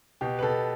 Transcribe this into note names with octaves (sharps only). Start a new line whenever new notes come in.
B2 G4
B4
B2 A4